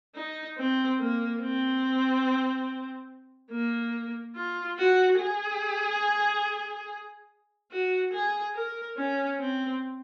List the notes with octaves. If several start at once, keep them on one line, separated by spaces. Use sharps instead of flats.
D#4
C4
A#3
C4
A#3
F4
F#4
G#4
F#4
G#4
A#4
C#4
C4